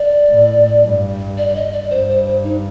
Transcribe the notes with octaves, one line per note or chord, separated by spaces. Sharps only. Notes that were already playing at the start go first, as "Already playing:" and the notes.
Already playing: D5
A2
G2
D5
D5
D#5
D5
G2 C5
C5
C5
D#4